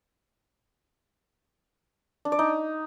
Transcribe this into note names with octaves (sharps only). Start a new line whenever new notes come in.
D4
D5
D#4